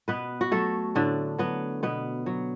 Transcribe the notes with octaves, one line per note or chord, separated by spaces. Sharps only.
B2 B3 B4
F#4
F#3 A3 A4
A2 D3 D4
F#3 B3
B2 B3
F#3